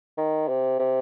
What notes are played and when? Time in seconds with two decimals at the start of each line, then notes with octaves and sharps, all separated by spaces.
0.18 D#3
0.49 C3
0.79 C3